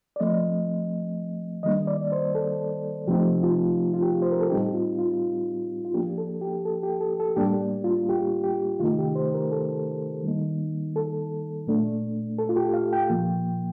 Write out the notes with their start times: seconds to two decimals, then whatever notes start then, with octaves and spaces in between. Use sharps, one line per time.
0.16 D5
0.20 F3 A3 C4 D#5
1.63 D#3 G3 A#3 D4 D#5
1.87 D5
2.12 C5
2.35 A4
3.07 C3 F3 A3 C4 D#4 G4
3.43 F4
3.93 F4
4.02 G4
4.22 C5
4.32 A#4
4.40 A4
4.50 A2 G3 C4 D#4 G4
4.74 F4
4.99 F4
5.85 F4
5.94 F3 A#3 D4 G4
6.18 A4
6.41 G4
6.65 A4
6.83 G4
7.00 A4
7.20 A4
7.36 A2 G3 A#3 D4 G4
7.84 F4
8.09 G4
8.44 G4
8.80 C3 D#3 A3 D#4 F4
8.99 G4
9.15 C5
9.34 A#4
9.52 A4
10.23 D#3 G3 A#3 D#4
10.96 A4
11.67 A#2 A3 D4
12.39 A4
12.49 F4
12.56 G4
12.74 F5
12.93 G5
13.09 A#2 F3 A#3